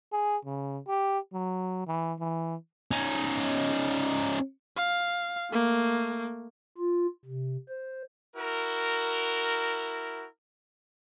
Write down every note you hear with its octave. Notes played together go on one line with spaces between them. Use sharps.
G#4
C#3
G4
F#3
E3
E3
C#4 D#4
F5
A3 A#3
F4
C3
C5
E4 F#4 A#4